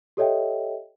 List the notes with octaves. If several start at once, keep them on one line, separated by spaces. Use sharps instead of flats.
G4 A4 C#5 D#5 E5 G5